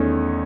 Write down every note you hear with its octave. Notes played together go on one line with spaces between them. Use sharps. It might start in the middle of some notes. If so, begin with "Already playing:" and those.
Already playing: E2 D#3 A3 C#4